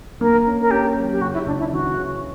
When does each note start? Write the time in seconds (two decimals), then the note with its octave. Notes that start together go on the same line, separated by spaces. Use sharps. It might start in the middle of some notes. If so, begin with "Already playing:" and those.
0.21 A#3 A#4
0.46 C#4
0.61 A#4
0.71 C#4 G4
0.97 F#3
1.12 G4
1.21 C#3 F#4
1.33 E4
1.46 C#2 D4
1.59 E4
1.72 E3 F#4
1.97 C#3